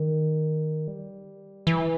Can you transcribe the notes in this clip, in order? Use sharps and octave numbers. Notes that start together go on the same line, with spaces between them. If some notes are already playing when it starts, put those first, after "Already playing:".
Already playing: D#3
G3
E3